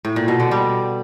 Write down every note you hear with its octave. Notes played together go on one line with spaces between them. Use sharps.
A2
A#2
B2
D3
G3